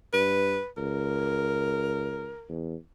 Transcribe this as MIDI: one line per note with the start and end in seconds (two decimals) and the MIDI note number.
0.13 0.57 43
0.13 0.68 71
0.77 2.34 37
0.77 2.53 70
2.49 2.75 40